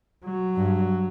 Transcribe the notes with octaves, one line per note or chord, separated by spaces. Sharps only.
F#3
G2